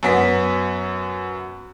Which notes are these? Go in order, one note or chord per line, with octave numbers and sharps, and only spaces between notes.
F#2 B3 B6